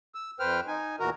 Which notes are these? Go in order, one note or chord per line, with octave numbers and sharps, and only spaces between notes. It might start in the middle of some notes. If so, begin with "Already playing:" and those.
E6
F2 B4 C5 G5 F6
D#4 G#5
E2 A#2 E3 F#4 A#4 A#5